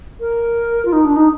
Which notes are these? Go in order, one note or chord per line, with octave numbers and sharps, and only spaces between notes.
A#4
F4
D#4
D4
D#4